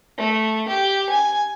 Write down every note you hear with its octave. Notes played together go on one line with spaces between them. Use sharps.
A3
G4
G#5